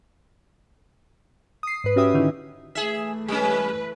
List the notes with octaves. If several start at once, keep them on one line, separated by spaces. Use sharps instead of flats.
D#6 C7
G#2 B4
C#4 F#4 G4 E5 D#6
D3 D#3 C#4 D#4 E4
E3 A3 G#4 E5
G3 C#4 B4